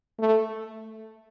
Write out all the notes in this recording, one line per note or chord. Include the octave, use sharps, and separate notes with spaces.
A3